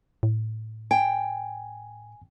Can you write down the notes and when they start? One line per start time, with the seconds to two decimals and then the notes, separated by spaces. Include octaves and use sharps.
0.23 A2
0.91 G5 G#5